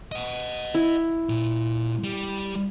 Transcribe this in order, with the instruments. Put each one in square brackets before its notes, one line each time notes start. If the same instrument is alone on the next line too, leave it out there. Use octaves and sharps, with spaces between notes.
[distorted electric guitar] D#5 F#5
[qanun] E4
[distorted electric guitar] A#2
G3